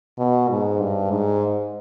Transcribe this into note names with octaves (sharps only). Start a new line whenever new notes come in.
B2
G#2
G2
G#2